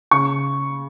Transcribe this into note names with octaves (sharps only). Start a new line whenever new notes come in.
C#3 C#6